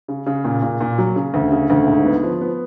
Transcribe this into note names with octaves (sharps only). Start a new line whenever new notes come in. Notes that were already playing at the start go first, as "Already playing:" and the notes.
C#3
C#3
A#2
A#2
A#2
F#3
C#3
D2
C#3
D2
G#2
B3
F3
B3